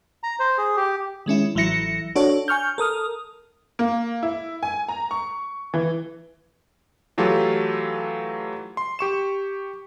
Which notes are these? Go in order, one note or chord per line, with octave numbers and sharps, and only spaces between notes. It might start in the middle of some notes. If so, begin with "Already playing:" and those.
A#5
C5
G#4
G4
D#3 G#3 C#4 E4
A1 E3 F#3 E4 A#6 C#7
D4 F#4 A4 C#5
G#5 C#6 F6 G6
A4 A#4 D#6 F6
A#3
E4
G#5
A#5
C#6
E3
E3 F#3 A3 F4 G4 A4
C6
G4 C#6 E7